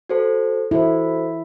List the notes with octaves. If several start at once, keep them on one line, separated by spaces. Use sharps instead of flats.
F#4 A4 C5
E4 F#4 A4 C5